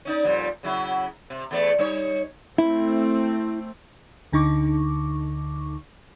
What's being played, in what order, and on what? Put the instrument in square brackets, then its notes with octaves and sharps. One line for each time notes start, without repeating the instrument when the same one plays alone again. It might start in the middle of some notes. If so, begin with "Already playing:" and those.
[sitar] C#4 D#4 D5
F2 A#2 G3
C#3 F#3 E4
C3
E2 A3 D5
G3 D#4 C#5
[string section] A3 C4 [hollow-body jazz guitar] E4
[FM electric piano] D2 D3 D#4 C#6 D6